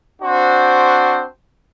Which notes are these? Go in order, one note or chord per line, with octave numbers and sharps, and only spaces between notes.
C4 D4 F#4 C5